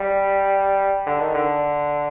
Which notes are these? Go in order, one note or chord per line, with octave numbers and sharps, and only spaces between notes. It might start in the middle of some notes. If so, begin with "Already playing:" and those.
Already playing: G3
D3
D#3
D3